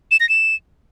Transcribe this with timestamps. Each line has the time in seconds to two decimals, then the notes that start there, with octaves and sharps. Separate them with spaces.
0.11 E7
0.20 A#6
0.29 E7